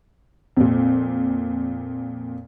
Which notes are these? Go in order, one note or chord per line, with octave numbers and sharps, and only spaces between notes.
F2 A#2